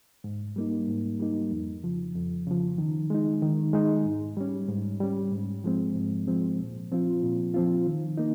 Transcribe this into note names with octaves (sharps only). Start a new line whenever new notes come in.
G#2
G3 A#3 D#4
G#2
G3 A#3 D#4
F2
C#3 F3
F2
C#3 F3
D#3
G#3 D#4
D#3
G#3 D#4
G#2
G3 C#4
G#2
G3 C#4
G#2
F3 G#3 C4
G#2
F3 G#3 C4
A#2
F3 C4 F4
A#2
F3 C4 F4
D#3
A#3 D#4